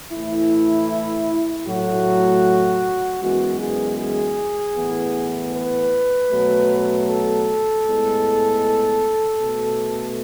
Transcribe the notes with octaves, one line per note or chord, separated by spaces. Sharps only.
A2 E3 A3 E4
A2 F#3 A3 F#4
F#2 E3 G#3 B3 F#4
G#4
G#4
A2 E3 B3
B4
B2 F#3 A3
A4
A2 G#3 B3
B2 A3